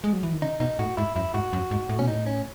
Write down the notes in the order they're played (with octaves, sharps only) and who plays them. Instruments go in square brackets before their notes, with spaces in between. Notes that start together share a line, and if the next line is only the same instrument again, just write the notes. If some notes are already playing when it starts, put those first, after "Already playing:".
[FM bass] G#3
F#3
E3
D#3
[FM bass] C#3 [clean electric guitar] D#4
[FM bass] B2 [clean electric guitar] D#4
[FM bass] A2 [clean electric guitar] F#4
[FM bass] G#2 [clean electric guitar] E4
[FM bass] F#2 [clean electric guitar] E4
[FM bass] G#2 [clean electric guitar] F#4
[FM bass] F#2
G#2
A2
[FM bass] B2 [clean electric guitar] C#4
[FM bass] A2 [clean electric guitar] D#4
[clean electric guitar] C#4